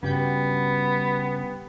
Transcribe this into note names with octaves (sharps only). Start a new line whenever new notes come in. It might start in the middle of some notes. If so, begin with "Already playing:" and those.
G2 C#3 G3 B3 F#4 G5